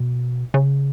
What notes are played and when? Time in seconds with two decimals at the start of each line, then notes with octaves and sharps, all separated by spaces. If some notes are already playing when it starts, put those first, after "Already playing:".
Already playing: B2
0.54 C#3